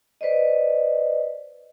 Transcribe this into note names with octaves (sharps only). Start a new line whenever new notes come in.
B4 C5 D5 D#5